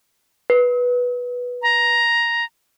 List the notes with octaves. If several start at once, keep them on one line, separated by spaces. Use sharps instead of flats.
B4
A#5